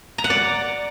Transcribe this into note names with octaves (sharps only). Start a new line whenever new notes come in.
A#5
F#5
D5